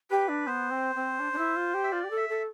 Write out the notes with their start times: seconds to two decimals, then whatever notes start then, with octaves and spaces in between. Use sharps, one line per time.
0.10 G4 B4
0.28 D4
0.47 B3 C5
0.70 C4
0.95 C4
1.19 D4
1.32 D4
1.38 E4
1.56 F4
1.74 G4
1.84 E5
1.92 F4 D5
2.04 G4
2.10 A4
2.17 E5
2.29 A4